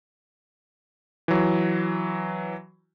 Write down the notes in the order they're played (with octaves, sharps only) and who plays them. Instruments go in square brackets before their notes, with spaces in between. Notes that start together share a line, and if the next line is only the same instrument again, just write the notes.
[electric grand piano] E3 F#3